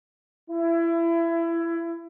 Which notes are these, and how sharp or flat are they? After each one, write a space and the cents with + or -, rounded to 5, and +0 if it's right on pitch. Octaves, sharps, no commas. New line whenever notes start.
E4 +25